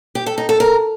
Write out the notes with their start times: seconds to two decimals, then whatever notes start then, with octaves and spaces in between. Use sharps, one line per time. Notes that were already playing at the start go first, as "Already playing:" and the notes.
0.15 G4
0.26 A4
0.38 D#4
0.49 A4
0.60 A#4